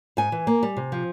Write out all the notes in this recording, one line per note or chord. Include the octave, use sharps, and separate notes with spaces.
G#2 G#5
E3
A#3
G3
C3
F3